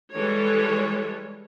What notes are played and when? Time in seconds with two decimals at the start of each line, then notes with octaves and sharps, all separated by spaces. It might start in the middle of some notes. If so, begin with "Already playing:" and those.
0.12 E3 G3 G#3 A4 C#5